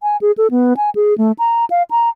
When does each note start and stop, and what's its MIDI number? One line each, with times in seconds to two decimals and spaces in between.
0.02 0.17 80
0.21 0.32 68
0.38 0.48 69
0.51 0.74 59
0.77 0.90 80
0.95 1.16 68
1.18 1.32 57
1.39 1.65 82
1.70 1.83 77
1.91 2.09 82